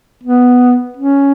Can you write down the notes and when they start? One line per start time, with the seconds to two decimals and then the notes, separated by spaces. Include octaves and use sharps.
0.24 B3
0.97 C#4